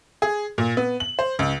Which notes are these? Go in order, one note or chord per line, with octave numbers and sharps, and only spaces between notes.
G#4
A#2
B3
F#7
C5
C#2